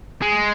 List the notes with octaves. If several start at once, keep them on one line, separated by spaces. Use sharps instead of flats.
G#3